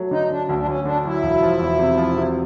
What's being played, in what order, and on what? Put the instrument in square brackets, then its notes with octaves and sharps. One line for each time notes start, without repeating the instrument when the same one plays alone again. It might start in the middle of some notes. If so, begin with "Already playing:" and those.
Already playing: [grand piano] F#3 A3
[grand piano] D3 [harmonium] D#4
[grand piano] D3 [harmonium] D4
[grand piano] D2 [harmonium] D4
[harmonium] D4
[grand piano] D2 [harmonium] C#4
[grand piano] D3 [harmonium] D4
[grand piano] F#3 [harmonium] E4
[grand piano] E1
F3
E2
C3
F3
C3